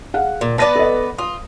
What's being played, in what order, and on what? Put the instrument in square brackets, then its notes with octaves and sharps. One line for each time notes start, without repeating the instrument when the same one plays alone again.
[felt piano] G#4 F5 F#5
[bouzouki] A#2
[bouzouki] B3 B4 D5 [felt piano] A5 A#6 D#7
[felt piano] A4 D#5
[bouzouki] F4 [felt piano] D#6